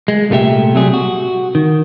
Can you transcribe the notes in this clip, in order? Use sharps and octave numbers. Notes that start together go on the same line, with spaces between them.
G#3
C2 A#2 A3 G4 E5
C3 F#3 G3 G#4
F#4
D#3